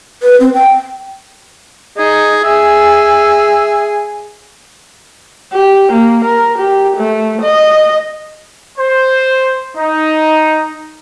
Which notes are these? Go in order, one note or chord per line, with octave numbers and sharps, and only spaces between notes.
B4
C4
G5
D#4 G#4
G#4 E5
G4
A#3
A#4
G4
A3
D#5
C5
D#4